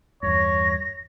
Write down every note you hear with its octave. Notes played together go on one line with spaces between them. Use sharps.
E2 G2 C#5 A#6